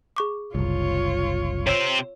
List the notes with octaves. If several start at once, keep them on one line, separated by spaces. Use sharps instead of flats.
G#4 C#6 D6
F#1 C2 F4 C#5
C3 C5 C#5 E6 D7